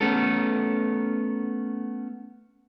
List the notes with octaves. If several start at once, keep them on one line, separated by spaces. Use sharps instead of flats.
A3 B3 C#4 A4